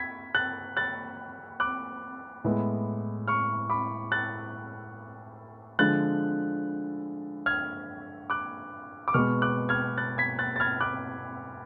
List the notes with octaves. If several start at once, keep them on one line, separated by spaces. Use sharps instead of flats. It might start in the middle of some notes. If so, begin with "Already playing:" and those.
Already playing: G#6 B6
F#6 A6
F#6 A6
D6 F#6
A2 G#3 B3
C#6 F6
B5 D6
F#6 A6
D3 F3 G#3 F#6 A6
F6 G#6
D6 F#6
D6
B2 G#3 B3 C#6 F6
D6 F#6
F6 G#6
F#6 A6
G#6 B6
F#6 A6
A6
F6 G#6
D6 F#6